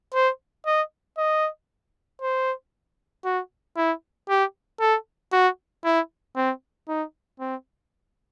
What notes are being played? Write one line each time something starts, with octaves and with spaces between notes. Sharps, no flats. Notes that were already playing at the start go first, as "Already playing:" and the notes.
C5
D#5
D#5
C5
F#4
E4
G4
A4
F#4
E4
C4
D#4
C4